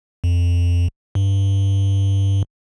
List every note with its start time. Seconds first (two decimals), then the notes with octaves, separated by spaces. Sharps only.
0.24 F2
1.15 G2